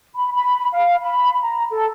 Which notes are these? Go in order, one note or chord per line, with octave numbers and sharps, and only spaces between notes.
B5
B5
F5
B5
A#5
A4